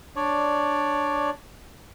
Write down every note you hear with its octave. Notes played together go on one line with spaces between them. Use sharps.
D4 C#5 D5